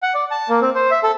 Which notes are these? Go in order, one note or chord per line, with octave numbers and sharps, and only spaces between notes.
F#5
D5
A5
A#3
C4
C5
E5
A4